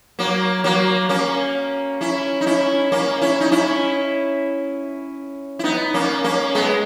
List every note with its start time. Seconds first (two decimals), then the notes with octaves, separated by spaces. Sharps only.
0.19 F#3 A#3
0.64 F#3 A#3
1.09 A#3 C#4
2.01 C#4 E4
2.41 D#4
2.46 C#4 E4
2.92 A#3 C#4
3.21 C#4 E4
3.41 D#4
3.52 C#4 E4
5.59 E4
5.64 B3 D#4
5.94 A#3 C#4
6.24 A#3 C#4
6.55 G#3 B3